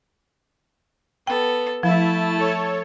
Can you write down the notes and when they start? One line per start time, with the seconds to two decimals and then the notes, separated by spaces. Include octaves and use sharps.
1.27 B3 A4 G5
1.83 F3 A3 E4 A5
2.37 A4 C#5